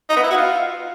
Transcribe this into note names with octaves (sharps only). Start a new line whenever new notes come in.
D#4
B3
E4
F#4
F4